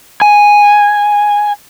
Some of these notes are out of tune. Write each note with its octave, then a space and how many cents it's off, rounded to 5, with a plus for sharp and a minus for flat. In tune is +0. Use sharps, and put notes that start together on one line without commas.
G#5 -5